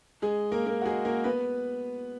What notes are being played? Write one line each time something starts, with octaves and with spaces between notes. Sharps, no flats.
G#3 G#4
A#3 A#4
A#3 A#4
F#4
G#3 G#4
A#3 A#4
B3 B4